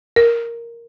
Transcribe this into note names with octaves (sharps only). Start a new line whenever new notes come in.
A#4